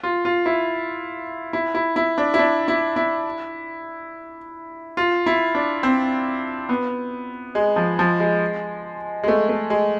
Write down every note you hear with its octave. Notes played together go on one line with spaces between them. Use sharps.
F4
F4
E4
E4
E4
E4
D4
E4
D4
E4
E4
F4
E4
D4
C4
B3
G#3
F3
F3
G#3
G#3
A3
A3
G#3